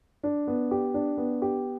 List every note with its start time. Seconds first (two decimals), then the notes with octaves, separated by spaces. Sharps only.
0.23 D4
0.47 B3
0.71 G4
0.94 D4
1.18 B3
1.42 G4